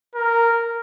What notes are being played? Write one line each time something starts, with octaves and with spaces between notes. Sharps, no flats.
A#4